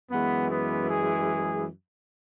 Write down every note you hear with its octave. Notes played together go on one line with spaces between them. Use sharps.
F#2 E3 G#3 B3
B3
G#4